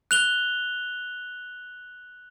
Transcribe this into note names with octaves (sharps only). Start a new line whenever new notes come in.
F#6 F7 G7